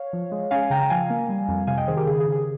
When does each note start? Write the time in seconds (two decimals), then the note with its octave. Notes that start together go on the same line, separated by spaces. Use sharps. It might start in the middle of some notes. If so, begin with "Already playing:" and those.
Already playing: C#5 F5
0.13 F3
0.32 G#3
0.51 C#4 F5 G#5
0.70 C#3 G5 A#5
0.90 F3 F5 G#5
1.10 A#3
1.29 G3
1.48 F2
1.67 C3 F5 G#5
1.77 D#5 G5
1.87 D#3 G#4 C5
1.97 G4 A#4
2.06 C#3 G#4
2.20 G#4
2.26 C#3
2.32 G#4